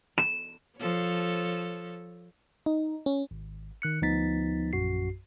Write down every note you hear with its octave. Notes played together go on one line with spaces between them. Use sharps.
E7
F3 A4 C#5
D#4
C#4
G#1
D#3 F#6 C#7
D2 F3 B3 D#4 A6 B6
A#1 F#2 F#4 C7